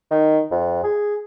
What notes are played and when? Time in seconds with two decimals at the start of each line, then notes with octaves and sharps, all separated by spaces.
0.11 D#3
0.51 F2
0.84 G#4